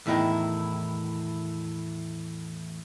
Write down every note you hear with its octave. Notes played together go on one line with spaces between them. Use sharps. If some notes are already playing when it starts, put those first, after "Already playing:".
E2 A2 D#3 E4 D#5 G5